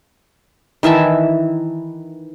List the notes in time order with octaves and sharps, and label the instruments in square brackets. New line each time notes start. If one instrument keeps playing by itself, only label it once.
[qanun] D#3 E3 E5 A5